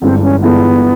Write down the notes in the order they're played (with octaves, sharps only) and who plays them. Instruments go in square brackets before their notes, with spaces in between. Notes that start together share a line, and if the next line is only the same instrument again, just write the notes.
[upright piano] G1 G2 E3 G#3 [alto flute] C4
[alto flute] C#4
[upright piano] G1 G2 E3 G#3 [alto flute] B3